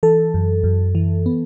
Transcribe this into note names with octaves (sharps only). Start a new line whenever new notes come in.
E3 A4
F#2
F#2
E3
B3